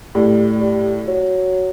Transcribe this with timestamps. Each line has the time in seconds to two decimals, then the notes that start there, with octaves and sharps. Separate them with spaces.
0.15 A2 G3
0.61 G3
1.07 F#3